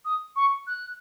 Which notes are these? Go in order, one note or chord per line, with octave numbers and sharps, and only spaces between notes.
D#6
C#6
F#6